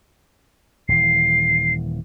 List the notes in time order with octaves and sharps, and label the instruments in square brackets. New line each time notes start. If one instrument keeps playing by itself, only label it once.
[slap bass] D#1 E3 [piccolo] C7